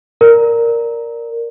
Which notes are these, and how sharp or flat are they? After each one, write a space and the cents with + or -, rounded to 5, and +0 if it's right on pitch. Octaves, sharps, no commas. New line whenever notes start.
A#4 +0 D5 +0